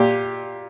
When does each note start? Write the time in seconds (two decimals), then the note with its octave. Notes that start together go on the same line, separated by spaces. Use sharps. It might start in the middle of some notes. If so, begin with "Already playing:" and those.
Already playing: A#2 G4